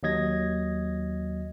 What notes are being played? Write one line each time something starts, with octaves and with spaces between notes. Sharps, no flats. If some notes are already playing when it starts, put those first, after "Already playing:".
D#2 F#3 D#5 G#6 A#6